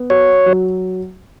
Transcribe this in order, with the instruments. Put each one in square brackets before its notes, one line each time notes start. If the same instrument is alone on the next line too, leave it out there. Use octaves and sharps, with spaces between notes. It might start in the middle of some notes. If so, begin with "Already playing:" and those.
Already playing: [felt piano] B3
[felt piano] F#4 [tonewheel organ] C#5
[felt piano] F#3